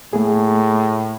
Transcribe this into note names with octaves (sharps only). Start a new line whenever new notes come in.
A2 A3 A#3 G#4